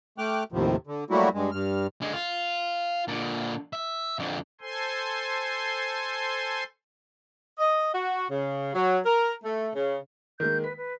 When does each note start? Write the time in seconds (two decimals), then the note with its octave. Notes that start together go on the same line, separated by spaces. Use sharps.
0.18 A3 G5 D6 F6 F#6
0.52 D#2 A2 C3 F3
0.87 D3
1.10 F#3 G3 A3 A#3 E4 F#4
1.34 G2 G#3
1.51 G2 F6
2.02 D3 G#3
2.13 F4
3.08 A#2 D3
3.73 E5
4.19 F2 D3
4.61 A4 C5 G#5 C6
7.57 D#5
7.92 F#4
8.29 C#3
8.74 F#3
9.05 A#4
9.43 A3
9.74 C#3
10.40 D#3 G#3 A#3 G6
10.64 B4 B6
10.77 B4